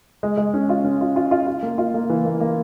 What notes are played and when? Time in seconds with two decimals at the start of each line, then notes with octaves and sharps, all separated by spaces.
0.23 G#3
0.37 G#3
0.54 C#4
0.69 F4
0.84 C#4
1.01 F4
1.16 F4
1.31 F4
1.47 F4
1.63 A#3
1.78 F4
1.94 A#3
2.10 E3
2.25 A#3
2.40 A#3